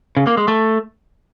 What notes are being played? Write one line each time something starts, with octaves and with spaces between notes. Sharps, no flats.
C#3
A#3
G#3
A3